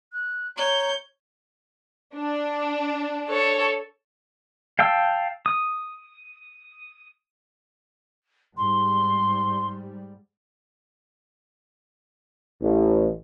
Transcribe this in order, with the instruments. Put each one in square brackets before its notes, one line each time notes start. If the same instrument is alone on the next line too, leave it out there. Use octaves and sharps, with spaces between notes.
[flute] F#6
[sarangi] C#5 [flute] A#5 [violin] G6
[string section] D4
[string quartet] A4 C#5
[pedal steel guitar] F5 G5 A5 E6
D#6
[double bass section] G#2 G3 [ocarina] C6
[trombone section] A1